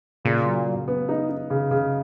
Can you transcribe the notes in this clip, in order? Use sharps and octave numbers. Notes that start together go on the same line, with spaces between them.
A#2 C#3
F#3
F#3
B3
D#4
D#4
C#3
C#3